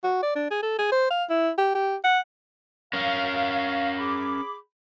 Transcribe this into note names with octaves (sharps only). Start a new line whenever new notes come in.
F#4
D5
D4
G#4
A4
G#4
C5
F5
E4
G4
G4
F#5
C#4 A#4 F5
G#4 B5 D6